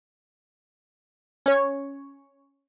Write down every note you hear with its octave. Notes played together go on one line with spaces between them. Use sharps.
C#4 C#5